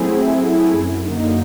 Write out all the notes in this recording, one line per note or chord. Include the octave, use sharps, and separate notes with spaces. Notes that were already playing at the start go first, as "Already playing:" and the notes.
Already playing: F#3 A3 C4 E4 G#4
F#3
A3 C4 E4 G#4
F#2
D3 F#3 A#3 D#4